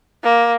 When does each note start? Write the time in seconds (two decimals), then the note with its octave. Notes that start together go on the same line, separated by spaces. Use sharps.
0.24 A#3